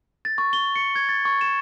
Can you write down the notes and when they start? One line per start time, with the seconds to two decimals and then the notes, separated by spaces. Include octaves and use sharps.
0.25 A6
0.38 C#6
0.53 G7
0.76 C#7
0.96 G#6
1.09 A6
1.25 C#6
1.41 E7